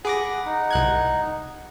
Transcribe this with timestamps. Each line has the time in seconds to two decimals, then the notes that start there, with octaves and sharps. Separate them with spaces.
0.05 G#4 F#5 B5 D6 A#6
0.45 D#4
0.71 C2 F#6 G#6